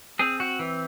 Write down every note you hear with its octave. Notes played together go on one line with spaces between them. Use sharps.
C4 G#4
F#4
E3